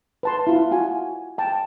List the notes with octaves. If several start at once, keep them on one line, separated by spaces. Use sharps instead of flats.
B4 A5 C6
E4 F4
F4 F#4 G#5
G5 A5